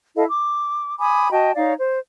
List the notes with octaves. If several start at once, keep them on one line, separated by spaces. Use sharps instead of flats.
E4 A4 D#5 F5
D6
G#5 B5 D6 D#6
F#4 D#5 G5 A5
D#4 C#5 D5 F5
C5